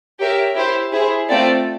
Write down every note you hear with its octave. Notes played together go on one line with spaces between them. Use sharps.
G4 A#4 C#5 E5
E4 G4 C5
E4 G#4 C5
A3 C4 F4 A4 D5